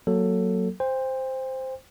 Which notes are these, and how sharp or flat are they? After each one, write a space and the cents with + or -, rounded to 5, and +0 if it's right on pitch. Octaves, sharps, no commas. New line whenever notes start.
F#3 +0 A#3 +0 A4 +10
C5 +0 G5 +35